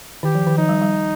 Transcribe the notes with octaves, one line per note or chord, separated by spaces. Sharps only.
D#3 G4
F3
D#3
F3 D#4
G3
G3